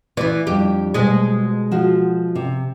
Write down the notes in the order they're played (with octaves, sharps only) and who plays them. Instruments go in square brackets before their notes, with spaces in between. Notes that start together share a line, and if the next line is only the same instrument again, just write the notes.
[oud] E3 B3 [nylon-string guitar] E4 D5
[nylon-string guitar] F2 G3 D4 [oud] G4
[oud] B2 G#3 [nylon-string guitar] G3 C5 D#5
[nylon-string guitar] F3 F#4
C3